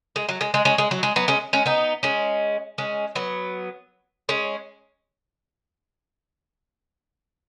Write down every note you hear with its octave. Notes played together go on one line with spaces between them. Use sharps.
G#3
F#3
G#3
G#3
G#3 C#4
G#3
F#3
G#3
F#3 B3
G#3 C#4
G#3 C#4
B3 D#4
G#3 C#4
G#3 C#4
F#3 B3
G#3 C#4